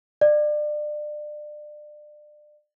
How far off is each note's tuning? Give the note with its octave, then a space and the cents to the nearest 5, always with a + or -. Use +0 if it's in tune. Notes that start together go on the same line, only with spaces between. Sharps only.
D5 +30